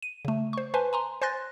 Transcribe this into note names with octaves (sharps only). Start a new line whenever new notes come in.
D#7
C#3 A3
C5 C#6
B4 C5 G#5 A5 C6
G#5 A#5 C6
C5 G#5 C6 F#6 A6 A#6